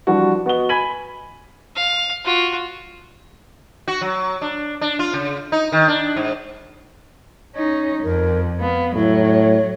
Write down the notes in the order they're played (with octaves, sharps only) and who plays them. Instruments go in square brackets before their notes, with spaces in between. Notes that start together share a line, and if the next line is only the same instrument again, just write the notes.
[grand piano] E3 F3 G3 D4 F#4
B3 F#4 D#5 G7
G#5 B5 G#6 B6 D#7 F#7
[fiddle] F5
F4 F#4
[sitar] F#4
F#3
D4
D4
F4
C#3
D#4
D#3
D4
G#2
[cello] C#4 D#4
[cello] F2 [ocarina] A#4
[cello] B3 [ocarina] F5
[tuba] A2 [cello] F#3 [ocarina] E4
[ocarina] C#5